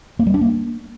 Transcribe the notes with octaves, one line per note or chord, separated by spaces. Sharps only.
A#3
G3
D4
A#3